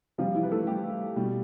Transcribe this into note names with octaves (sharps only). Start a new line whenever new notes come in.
C3 F3 G3 F4
E3 E4
B4
A3 A4
G3 G4
B2 G3